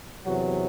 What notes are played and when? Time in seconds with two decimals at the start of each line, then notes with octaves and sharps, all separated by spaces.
0.22 E2 C3 F#3 F#4